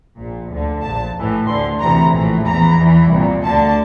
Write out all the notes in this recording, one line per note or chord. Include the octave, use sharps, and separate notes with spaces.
A#1 A#2
D2 D3
A#1 A#2 A5
A1 A2 E3
D2 D3 C6
D2 C3 E3 A#5
A#1 A2 E3
E2 E3 A#5
E2 E3
C2 A#2
D2 D3 A5